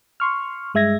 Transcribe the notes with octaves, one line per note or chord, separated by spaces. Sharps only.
C6 C#6 F6
G2 G#3 E5 G#6 A#6